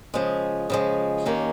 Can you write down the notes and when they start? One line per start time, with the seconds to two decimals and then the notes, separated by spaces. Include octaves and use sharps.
0.14 C#3 F3 G#3
0.70 C#3 F3 G#3
1.25 D#2 D#3 A#3 C#4